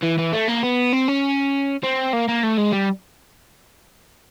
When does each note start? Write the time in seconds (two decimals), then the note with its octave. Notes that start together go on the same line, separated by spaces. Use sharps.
0.03 E3
0.18 E3
0.33 A3
0.48 A#3
0.63 B3
0.93 C4
1.08 C#4
1.83 C4
2.13 A#3
2.28 A#3
2.43 A3
2.58 G#3
2.73 G3